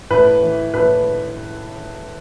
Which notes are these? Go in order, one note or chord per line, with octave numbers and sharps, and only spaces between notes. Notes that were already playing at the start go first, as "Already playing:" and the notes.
A2 B4
E3
A2 B4